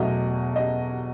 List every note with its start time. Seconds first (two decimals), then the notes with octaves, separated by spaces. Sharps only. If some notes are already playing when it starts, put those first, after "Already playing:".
Already playing: E2 B2 F#3 A3 D#5
0.56 D#5